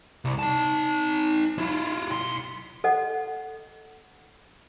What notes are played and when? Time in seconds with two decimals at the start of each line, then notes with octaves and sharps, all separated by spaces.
0.25 C2
0.39 D#4 A5
1.58 E4 F4
2.10 B1 C6
2.84 A4 D#5 F#5